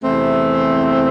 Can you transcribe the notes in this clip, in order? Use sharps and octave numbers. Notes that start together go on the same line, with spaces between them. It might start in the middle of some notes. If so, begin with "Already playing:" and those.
E2 C3 E3 A3 C4